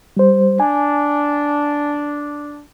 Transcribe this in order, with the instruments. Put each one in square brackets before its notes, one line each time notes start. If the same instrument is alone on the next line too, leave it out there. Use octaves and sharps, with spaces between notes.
[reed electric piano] G3 C5
[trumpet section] D4 [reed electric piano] G#5